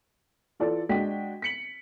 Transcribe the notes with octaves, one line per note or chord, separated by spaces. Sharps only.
E3 F4 A4 D5
G#3 D4 F#4 G5 B6
B6 C#7 F#7